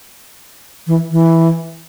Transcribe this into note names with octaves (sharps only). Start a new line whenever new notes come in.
E3
E3